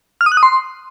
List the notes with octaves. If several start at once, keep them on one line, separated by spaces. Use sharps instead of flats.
F6
D#6
F#6
D#6
C6